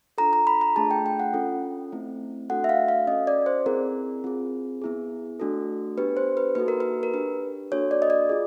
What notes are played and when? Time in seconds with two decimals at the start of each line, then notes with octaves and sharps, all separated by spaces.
0.18 D4 F4 A4 A#5
0.33 A#5
0.47 B5
0.61 A#5
0.76 A3 D4 F4 G#4 A5
0.91 G5
1.06 G5
1.20 F#5
1.34 C#4 F4 A4
1.92 A3 C4 E4
2.50 A3 D4 F#4 A4 F#5
2.64 E5
2.69 F5
2.88 F5
3.07 C#4 F#4 A4 D#5
3.27 D5
3.46 C5
3.66 C4 E4 G#4 A#4
4.24 C4 F4 G#4
4.82 B3 E4 G#4
5.40 A3 D4 F#4 A4
5.97 B3 D4 G4 B4
6.17 C5
6.37 B4
6.55 A#3 D#4 F#4 A4 B4
6.68 A#4
6.80 B4
7.03 A#4
7.13 D4 G4 B4
7.71 A#3 D4 F#4 A4 C#5
7.91 D5
8.02 D#5
8.10 D5
8.29 F4 G#4